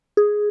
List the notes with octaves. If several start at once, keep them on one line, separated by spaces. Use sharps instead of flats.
G#4